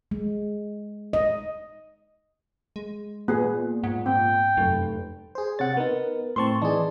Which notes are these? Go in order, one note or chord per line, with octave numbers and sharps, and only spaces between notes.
G#3
D#5
G#3
A#2 B3 G#4
G#2 F#5
C4 G5
F1 F#2
G#4 C5
C3 C#5 F#5 A6
B3 D#4 A#4
A2 C4 A5 C6 C#6
E3 D#4 G#4 D5 A5